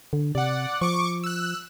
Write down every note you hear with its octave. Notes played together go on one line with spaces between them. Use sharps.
D3
C3 D5 F#5
F3 C#6 D6
E6 F#6